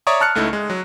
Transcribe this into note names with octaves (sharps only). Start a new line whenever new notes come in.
C#5 D5 E5 A#5 C#6 D#6
A5 F6 F#6 C#7
C#2 A3 D#4 E4
G#3
F#3